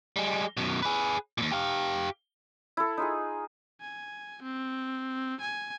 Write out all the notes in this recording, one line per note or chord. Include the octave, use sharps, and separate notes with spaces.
G3 G#3
F#2 B2
G#4 B4
D#2 A#2
G4 F5
E4 A4
D#4 F4 G#4
G#5
C4
G#5